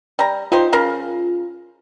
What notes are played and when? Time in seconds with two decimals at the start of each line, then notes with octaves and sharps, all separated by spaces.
0.19 G3 A#5
0.52 D#4 F4 G4 C5
0.73 C#3 A#4 F5